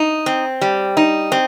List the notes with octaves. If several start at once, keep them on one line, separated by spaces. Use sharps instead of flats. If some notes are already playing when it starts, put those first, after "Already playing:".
Already playing: D#4
C4
G3
D#4
C4